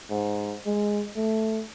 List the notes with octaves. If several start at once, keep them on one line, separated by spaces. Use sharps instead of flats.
G#2
G#3
A3